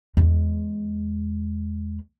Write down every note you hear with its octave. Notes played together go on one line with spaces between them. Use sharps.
E2 G#3